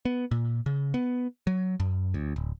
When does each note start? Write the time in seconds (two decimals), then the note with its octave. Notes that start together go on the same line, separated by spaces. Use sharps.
0.05 B3
0.31 A#2
0.66 C#3
0.94 B3
1.47 F#3
1.80 F#2
2.14 D2
2.36 D1